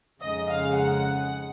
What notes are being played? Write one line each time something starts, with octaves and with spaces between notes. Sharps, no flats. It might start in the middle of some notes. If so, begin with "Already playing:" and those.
F2 C#3 G#3 D#4 D#5
F5
F#5